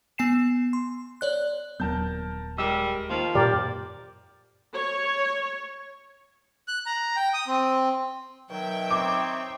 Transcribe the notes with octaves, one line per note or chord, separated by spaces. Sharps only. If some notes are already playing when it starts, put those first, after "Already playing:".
B3 G#5 C7 E7
C6
C#5 D5 F#6
D#1 F#3 B3 A#4 A5 G6
G3 G#3 A#4 E6
D#3 F3 A#3
F#2 A#2 G4 A#4 D5
C#5
F#6
A#5
G5
D#6
C4
B2 D#3 F#3 E5 G5
C4 D#4 C#5 D6